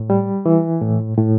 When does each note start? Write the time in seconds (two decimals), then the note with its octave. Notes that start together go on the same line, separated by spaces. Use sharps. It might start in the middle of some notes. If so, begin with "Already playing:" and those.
Already playing: A2
0.10 G3
0.46 E3
0.81 A2
1.17 A2